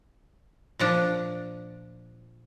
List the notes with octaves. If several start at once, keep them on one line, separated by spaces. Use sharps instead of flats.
A#2 F3 D4